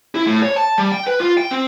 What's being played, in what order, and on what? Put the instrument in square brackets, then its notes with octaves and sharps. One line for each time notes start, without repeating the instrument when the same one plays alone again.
[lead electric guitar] E4
A2
C#5
A5
G3
G5
B4
F4
G5
C4